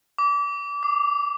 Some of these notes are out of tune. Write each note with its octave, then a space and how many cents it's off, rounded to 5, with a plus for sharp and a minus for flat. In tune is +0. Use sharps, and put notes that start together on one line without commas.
D6 -30
D6 +10